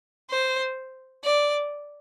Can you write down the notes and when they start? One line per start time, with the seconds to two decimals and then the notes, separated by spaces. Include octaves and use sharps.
0.30 C5
1.24 D5